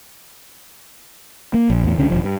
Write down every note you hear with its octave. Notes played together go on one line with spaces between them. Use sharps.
A#3
A#1
E2 A2
C#2 D3 C#4
D#1 C2 F3
G2